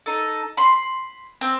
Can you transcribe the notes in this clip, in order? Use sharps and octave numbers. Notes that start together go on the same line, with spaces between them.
D#4 A4
B5 C6
C4